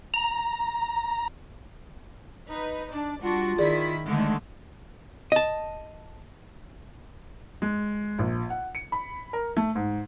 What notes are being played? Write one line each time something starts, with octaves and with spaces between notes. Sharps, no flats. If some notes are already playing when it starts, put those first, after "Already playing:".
A#5
D#4 B4
D4 D5
G3 D4 F4 F#4
D#3 E4 G#4 D5 B6
D3 D#3 G#3 A3
D#5 A5
G#3
A#1
F#5
C#7
B5
A#4
A3
G#2